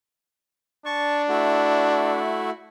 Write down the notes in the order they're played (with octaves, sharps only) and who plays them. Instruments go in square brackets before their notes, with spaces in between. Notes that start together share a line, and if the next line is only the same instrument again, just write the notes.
[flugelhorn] D4 [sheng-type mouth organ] A5 C#6
[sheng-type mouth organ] A3 E4 F#4